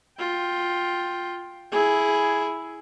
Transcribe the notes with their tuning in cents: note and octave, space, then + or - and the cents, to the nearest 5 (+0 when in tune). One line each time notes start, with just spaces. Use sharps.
F4 +10 G5 +0
E4 +0 G#4 +5